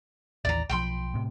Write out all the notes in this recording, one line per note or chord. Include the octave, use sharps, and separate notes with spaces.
A1 D#2 E3 D5 A#5
B1 F3 G5 B5 C6
A2 C3